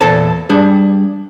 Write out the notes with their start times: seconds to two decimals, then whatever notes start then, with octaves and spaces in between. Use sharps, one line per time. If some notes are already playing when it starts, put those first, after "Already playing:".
0.01 E2 A#2 A4 C5 A5
0.49 G3 D4 G#4